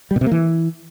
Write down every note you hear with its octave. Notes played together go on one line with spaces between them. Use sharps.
G3
B2
C3
A#3
E3